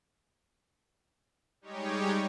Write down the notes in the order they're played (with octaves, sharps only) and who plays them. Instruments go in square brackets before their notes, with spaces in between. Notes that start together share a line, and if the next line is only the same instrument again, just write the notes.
[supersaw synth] G3 G#3 D#4 G4 C#5